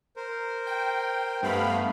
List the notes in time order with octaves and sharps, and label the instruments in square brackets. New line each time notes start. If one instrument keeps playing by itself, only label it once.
[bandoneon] A#4 C5
[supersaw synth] G5
[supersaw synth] G2 F5 B5 [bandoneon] A3 B3